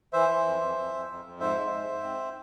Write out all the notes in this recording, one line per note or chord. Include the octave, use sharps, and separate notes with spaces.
E3 C5 E5
E3
F2
F2
F2
F2
F2
F2
G#2 C5 E5
G#3
G#2
G#2
C4